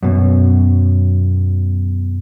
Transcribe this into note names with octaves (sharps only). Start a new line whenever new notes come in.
F#2 B2